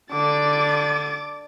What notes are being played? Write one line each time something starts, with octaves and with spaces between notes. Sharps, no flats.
D3 D6 A6